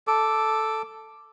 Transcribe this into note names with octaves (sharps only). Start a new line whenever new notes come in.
A4 D6